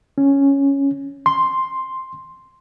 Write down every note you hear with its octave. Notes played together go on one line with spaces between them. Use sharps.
C#4
C6